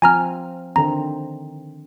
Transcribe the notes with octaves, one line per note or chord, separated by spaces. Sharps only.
F3 C4 G#5 A#5 F6
D3 D#3 C4 A#5